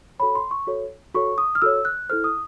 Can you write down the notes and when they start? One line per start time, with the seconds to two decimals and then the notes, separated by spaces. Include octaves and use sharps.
0.19 F#4 A4 C#5 B5
0.35 C6
0.51 C#6
0.67 F#4 A4 C#5
1.14 F#4 A4 C#5 C#6
1.38 D#6
1.55 F6
1.62 F#4 A4 C#5 E6
1.85 F#6
2.09 E4 A4 C5 F6
2.24 D#6